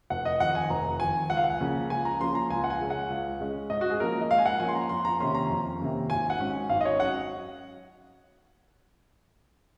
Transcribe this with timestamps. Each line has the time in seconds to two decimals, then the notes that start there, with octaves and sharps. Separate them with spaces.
0.10 F1 F#5
0.25 D#5
0.40 F2 D#3 F#5
0.55 G#5
0.70 F1 A#5
1.00 F2 D#3 G#5
1.30 C#2 F#5
1.37 F5
1.44 F#5
1.60 C#3 F3 A#3 C#4
1.90 C#2 G#5
2.05 A#5
2.20 C#3 F3 A#3 C#4 C6
2.35 A#5
2.50 C#2 G#5
2.64 F#5
2.70 G#5
2.80 C#3 G#3 C#4
2.90 F#5
3.10 C#2
3.40 C#3 G#3 C#4
3.70 G#2 D#5
3.81 F#4
3.91 G#4
4.00 F3 A#3 C#4 A#4
4.21 D#5
4.30 G#2 F5
4.38 G#5
4.46 F#5
4.60 F3 A#3 C#4 G#5
4.68 C6
4.75 A#5
4.89 F2 C6
5.05 A#5
5.20 C3 D#3 A#3 C#4 C6
5.35 A#5
5.50 F2
5.80 C3 D#3 A#3 C#4
6.10 G#1 G#5
6.30 F#5
6.40 G#2 F#3 C#4
6.69 G#1 F5
6.81 D#5
6.85 C#5
7.00 F#3 C#4 F#5